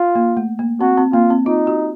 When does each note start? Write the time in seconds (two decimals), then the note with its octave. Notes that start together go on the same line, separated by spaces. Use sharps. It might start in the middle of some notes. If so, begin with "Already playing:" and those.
Already playing: F4
0.15 A#3
0.37 A3
0.59 A#3
0.81 C4 F#4
0.98 C4
1.13 A#3 F4
1.30 C4
1.46 D#4 F4
1.67 F#4